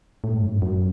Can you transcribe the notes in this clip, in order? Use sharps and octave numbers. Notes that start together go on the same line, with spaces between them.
A2
G#2
F#2
G#2
F#2